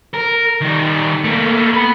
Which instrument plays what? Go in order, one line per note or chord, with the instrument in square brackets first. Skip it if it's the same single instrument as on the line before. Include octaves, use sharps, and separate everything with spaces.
[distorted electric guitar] A#4
D#3 G3
A3 A#3
B3 B4